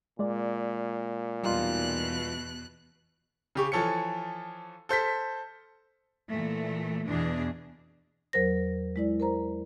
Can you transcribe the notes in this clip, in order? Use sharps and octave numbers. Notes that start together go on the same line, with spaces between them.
A#2 G#3 D5
E2 B2 G3 D#4 F4 F#6
C#3 G4 C#6
E3 F3 A4 C#5 C#7
A4 C5 G6 B6
A#2 E3 A3
E2 B2 E3 D4 G#4
E2 F#3 A#4 C5 A#6
G#3 E4 D5
A#4 C5 A#5